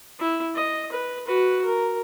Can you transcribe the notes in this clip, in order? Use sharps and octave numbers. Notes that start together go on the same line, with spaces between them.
E4
D#5
B4
F#4 B4
A#4